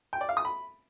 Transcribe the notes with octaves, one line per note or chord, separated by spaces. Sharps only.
G5
D5
F5
D#6
B5